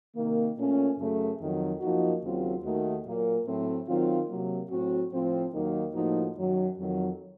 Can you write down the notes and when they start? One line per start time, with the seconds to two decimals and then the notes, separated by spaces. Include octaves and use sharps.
0.16 C3 D#3 A#3
0.57 A#2 A3 C#4
0.98 F#2 C#3 A3
1.39 F2 D#3 F#3
1.80 F#2 F3 A#3 D#4 F#4
2.23 D#2 C#3 F#3 C4 F4
2.63 D#2 D#3 A3 D#4 F#4
3.05 A#2 F#3 A#3
3.45 A2 F#3 A3 C4
3.88 D#3 F#3 C4 F4
4.28 C3 F#3 A#3
4.70 A2 F#3 C4 F#4
5.11 A2 F3 C4 F4
5.53 D#2 D#3 F#3 A#3 D#4
5.94 A2 F3 A#3 D#4 F#4
6.36 F#2 D#3 F#3
6.77 F2 D#3 F#3